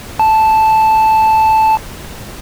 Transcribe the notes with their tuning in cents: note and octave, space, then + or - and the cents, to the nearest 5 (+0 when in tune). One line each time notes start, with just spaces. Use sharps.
A5 -5